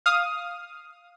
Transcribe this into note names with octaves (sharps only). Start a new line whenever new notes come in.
F5 D#6